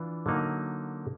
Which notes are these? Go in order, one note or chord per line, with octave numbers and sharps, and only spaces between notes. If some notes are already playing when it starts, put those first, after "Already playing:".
Already playing: E3 D4 F4
D3 F#3 A#3 D#4